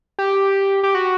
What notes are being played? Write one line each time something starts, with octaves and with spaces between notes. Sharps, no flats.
G4
G4
F#4